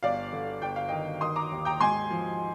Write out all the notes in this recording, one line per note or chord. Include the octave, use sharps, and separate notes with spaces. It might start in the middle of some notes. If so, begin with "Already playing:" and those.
G1 D5 F5
D3
G1 G5
F5
D#3 D#5 G5
D#3 C6 D#6
A#5 D6
D#2
G5 A#5
G#2 G#5 C6
F3